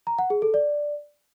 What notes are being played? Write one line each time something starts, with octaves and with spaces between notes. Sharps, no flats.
A#5
F#5
G#4
A4
D5